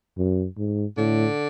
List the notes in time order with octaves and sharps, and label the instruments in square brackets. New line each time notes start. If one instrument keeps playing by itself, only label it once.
[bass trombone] F#2
G#2
[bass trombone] A2 [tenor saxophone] D3